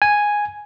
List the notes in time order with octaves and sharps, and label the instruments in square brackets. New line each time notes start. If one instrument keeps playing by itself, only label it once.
[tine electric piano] G#5